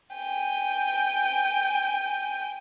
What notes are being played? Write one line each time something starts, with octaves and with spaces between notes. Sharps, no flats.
G5 G#5